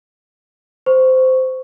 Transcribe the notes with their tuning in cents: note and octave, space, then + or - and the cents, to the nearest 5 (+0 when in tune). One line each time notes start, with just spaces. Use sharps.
C5 -15 C#6 +0